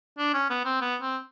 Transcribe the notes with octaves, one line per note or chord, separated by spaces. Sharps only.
D4
C#4
B3
C4
B3
C4